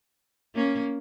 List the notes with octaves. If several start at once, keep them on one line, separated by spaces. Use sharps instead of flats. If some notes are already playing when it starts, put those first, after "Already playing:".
A#3 C#4